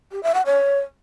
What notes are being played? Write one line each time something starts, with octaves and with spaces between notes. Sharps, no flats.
G4
E5
F#5
C#5